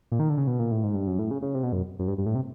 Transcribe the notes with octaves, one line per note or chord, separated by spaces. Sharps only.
A#2
D#3
D3
C#3
B2
A#2
A2
G#2
G2
F#2
A2
C#3
C#3
C3
B2
F#2
F#2
G2
G2
A2
C3